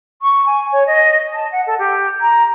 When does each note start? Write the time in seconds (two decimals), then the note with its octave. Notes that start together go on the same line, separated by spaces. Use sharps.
0.22 C#6
0.47 G#5
0.72 C#5
0.87 D#5
1.34 A5
1.52 F#5
1.67 A4
1.79 G4
2.21 A#5